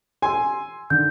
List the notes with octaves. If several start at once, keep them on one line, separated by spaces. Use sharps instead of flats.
G#5 C6 E6
D3 D#3 G6